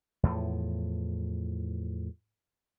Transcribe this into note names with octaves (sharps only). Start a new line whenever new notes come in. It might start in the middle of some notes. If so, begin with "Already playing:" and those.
E2 A2 F3